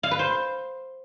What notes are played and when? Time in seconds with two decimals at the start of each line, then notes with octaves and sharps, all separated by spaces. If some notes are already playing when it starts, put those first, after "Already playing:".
0.03 F5
0.11 B4
0.19 C5